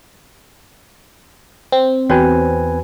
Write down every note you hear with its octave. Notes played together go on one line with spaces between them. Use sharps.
C4
E2 F#4 B4 C#5 G5 G#5